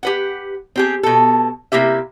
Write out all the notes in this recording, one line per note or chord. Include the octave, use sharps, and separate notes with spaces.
G4 B4 F#5
C4 G4 G#4
B2 A4
C3 A#3 E4 G4 E5